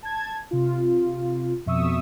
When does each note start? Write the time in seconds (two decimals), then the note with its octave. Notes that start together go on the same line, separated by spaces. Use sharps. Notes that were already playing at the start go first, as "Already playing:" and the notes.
0.03 A5 G#6
0.51 C3 F4
1.66 F2 B2 E5 C#6 D#6 E6